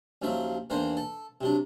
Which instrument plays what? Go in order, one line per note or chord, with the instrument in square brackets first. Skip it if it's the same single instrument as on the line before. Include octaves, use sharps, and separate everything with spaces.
[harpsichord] D#2 C#3 F3 F#3 E5 F5
E2 D#3 E3 A#3 D4 C5
A4
C3 F#3 D4